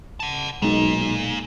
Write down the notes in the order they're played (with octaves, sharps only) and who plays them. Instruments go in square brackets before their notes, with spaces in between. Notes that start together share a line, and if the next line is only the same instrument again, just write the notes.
[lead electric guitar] F#5 A5
[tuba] B1 [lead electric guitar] A#2 [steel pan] G#3 D#4